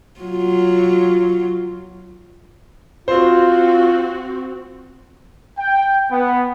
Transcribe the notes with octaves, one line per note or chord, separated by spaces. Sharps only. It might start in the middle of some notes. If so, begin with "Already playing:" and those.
F#3 F4
C4 F4 F#4 C5
G5
B3